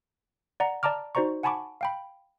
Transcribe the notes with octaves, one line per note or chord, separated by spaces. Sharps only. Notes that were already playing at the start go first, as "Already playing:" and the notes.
D5 F#5 A#5
D5 A5 A#5 D6 F6
D#4 F#4 C5 D5 A#5 C#6
F#5 G#5 A5 B5 C#6 D6
F5 G5 B5